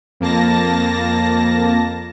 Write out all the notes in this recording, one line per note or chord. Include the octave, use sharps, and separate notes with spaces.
F2 A#3 A5 A#6